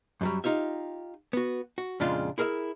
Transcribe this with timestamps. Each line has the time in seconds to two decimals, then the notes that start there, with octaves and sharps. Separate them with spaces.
0.21 F#2 F#3 G3
0.44 D#4 F4 G4 E5
1.33 B3 F#4
1.78 F#4
2.00 F2 A#2 C#3 G#3 D4 F4
2.38 E4 G#4 A#4 B4 E5